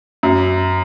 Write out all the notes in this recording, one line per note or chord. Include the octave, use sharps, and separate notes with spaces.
F#2